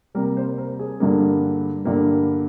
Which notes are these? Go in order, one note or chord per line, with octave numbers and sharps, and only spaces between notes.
C3 G3 A#3 A#4
C5
A#4
G#4
G2 D3 G3 A#3
G2 D3 G3 A#3